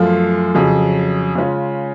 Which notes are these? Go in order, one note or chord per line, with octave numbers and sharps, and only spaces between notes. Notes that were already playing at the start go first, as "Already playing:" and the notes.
Already playing: F#2 F3 A3 F4
F2 C#3 F#3
C#3 G#3 C#4 F4